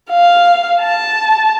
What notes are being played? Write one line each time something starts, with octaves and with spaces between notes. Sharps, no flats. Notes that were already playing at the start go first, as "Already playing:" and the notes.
F5
A5